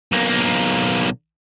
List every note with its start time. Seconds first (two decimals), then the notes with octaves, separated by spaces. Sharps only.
0.12 B1 A#3